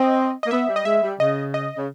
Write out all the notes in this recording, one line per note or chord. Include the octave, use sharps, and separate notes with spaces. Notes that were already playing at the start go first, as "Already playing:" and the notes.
Already playing: C4 D#5
A#3 D#5
B3 E5
G3
D#5
G#3 E5
G3
C#3 D#5
D#5
C#3